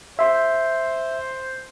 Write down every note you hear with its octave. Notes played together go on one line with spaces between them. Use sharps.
C5 E5 C6